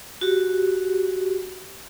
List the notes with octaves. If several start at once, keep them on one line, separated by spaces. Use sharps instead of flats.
F#4 G4